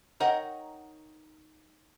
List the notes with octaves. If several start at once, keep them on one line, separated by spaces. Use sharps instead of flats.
D#4 A#4 C#5 F#5 G5